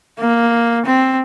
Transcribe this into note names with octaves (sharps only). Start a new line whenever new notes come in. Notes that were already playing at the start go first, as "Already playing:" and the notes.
A#3
C4